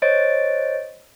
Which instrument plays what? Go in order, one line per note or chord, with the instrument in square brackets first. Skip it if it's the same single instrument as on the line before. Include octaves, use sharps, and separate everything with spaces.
[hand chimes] C5 C#5 D#5 A6 D7